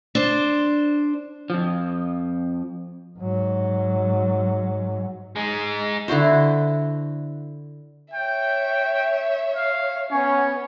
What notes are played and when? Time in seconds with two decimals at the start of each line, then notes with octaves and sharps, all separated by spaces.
0.15 D4 C5
1.50 F2 F3
3.19 G#2 F#3
5.36 G#3 D#4
6.08 D3 E4 F#4 C5
8.14 C#5 E5 G5
9.56 F5
10.11 B3 C#4 C#5